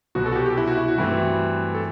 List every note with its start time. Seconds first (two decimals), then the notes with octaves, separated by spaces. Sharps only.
0.15 C2 B2 F#3 F#4
0.26 A4
0.32 F#4
0.36 G4
0.46 G4
0.57 E4
0.67 F#4
0.77 E4
0.88 F#4
0.98 G2 E3 A3 C4
1.75 A4